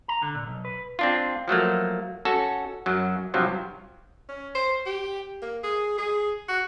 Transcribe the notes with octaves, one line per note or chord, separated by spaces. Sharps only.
A#5
D3
A#2
B1
B4
C4 D4 F4
F3 F#3 A3 A#3
C#4 F#4 A4
F#2 F#3
G2 C3 F3 F#3
C#4
C5
G4
A#3
G#4
G#4
F#4